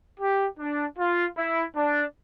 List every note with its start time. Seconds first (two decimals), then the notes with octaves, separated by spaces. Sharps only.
0.20 G4
0.59 D4
0.99 F4
1.37 E4
1.77 D4